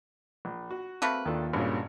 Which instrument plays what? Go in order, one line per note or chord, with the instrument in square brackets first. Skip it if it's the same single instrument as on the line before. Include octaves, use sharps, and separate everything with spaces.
[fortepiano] A#1
F#4
[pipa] A3 A#3 B4 [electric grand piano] C4
[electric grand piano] D#2 F4 [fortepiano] D#3 D4 A4
[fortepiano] G#1 C#3 C#4 [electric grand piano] G2 A#2